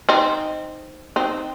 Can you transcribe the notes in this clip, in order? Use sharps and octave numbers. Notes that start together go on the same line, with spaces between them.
C4 D#4
C4 D#4